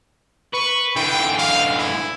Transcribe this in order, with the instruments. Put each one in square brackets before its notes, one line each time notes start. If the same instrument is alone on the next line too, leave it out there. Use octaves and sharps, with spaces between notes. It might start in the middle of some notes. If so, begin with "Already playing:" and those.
[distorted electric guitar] B4 [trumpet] C#6
[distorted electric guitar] D3 E3 [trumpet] G5
[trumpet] F5
E4